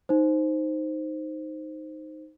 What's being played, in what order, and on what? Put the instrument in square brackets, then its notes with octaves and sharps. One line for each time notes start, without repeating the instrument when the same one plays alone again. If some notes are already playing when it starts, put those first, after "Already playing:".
[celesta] D#4 C5